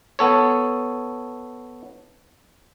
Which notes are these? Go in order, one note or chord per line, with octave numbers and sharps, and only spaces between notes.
B3 A4 C#5